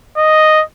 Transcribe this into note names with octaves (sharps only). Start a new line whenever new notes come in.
D#5